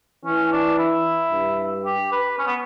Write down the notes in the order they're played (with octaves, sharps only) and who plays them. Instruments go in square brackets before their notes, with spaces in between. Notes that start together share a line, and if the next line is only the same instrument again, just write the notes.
[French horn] E3 [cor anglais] C#4
[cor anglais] D4
E4
[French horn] G2
[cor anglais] G4
B4
C#4
B3